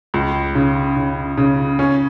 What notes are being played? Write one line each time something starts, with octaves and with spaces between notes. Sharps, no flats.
C#2
C#3
C#3
C#3
C#4